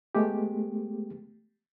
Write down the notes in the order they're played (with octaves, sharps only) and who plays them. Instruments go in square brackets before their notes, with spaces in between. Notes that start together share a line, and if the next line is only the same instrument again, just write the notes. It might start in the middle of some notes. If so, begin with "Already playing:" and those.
[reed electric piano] G#3 A3 B3 G4